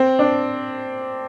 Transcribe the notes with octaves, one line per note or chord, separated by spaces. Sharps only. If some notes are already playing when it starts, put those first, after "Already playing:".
Already playing: C4
D4